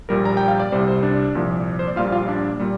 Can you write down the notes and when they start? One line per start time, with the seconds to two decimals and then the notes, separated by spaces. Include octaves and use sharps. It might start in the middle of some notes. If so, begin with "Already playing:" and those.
0.09 A#1 A#2 G3 A#4
0.25 A#5
0.37 G5
0.48 F5
0.60 D5
0.72 C2 C3 G3 C5
0.88 C5
1.03 D4 D5
1.35 C2 A#2 F3
1.79 C5
1.88 D5
1.96 A#1 A#2 G3 F4 F5
2.12 F4 F5
2.28 D4 D5
2.60 A#2 G3